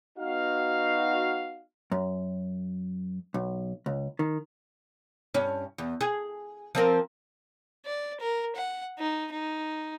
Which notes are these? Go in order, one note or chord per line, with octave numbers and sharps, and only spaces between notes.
B3 D#4 F#4 F5
F#2
B1
C#2
D#3
G2 C#4
E2
G#4
F3 C4 A#4
D5
A#4
F#5
D#4
D#4